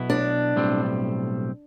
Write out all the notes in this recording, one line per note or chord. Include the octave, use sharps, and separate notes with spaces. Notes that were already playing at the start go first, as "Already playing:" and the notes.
Already playing: B1 B2 B3 E4
D4
B1 A2 G3 C4